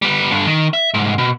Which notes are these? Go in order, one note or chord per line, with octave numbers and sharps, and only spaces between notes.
G3 B3
G2 D3
D#3
E5
C2 G#2
B2